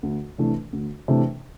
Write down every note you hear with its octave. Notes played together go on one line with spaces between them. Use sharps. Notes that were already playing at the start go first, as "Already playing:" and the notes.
D2
C3 E3 A3 D4
D2
C3 E3 A3 D4